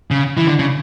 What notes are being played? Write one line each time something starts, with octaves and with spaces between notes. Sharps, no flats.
C#3
E3
D3
C#3